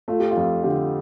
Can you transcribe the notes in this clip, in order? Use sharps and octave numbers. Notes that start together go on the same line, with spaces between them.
A3 F4
G4
F4
F2
D3 G4